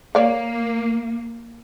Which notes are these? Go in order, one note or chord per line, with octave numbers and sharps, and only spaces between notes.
A#3 C#5 D5 F5